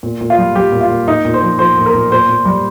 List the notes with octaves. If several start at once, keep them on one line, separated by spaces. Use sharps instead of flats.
A#2
A#2
F4
G3
G3 G4
A#2
F4
A#2
A#2 D#4
A#2
C5
F3
F3 C5
A#2
A#4
A#2
A#2 C5
A#2
G3